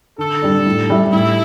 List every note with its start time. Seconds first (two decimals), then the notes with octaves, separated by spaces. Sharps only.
0.18 D3 A4
0.42 G3 D4
0.66 A2
0.90 G3 E4
1.13 A2 E4